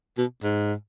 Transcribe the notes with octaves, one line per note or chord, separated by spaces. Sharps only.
B2
G#2